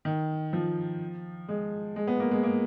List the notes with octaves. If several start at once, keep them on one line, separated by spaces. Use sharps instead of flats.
D#3
F3
G#3
G#3
B3
A#3
G#3
A#3